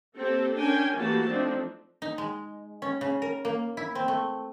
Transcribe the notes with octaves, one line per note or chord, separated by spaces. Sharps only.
A#3 C4 G4 A4
C#4 D4 A#4 G5 G#5
E3 A3 A#3 F#4 G4 A5
F3 A3 C4 D4 D#4
D#4
G#3
C#4
C#3
A#4
A#3
E4
C4
A3